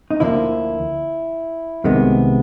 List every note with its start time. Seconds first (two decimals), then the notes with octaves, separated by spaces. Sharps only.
0.11 D#4
0.20 D2 D3 F3 A#3 E4
1.84 C2 C3 D#3 G#3 B3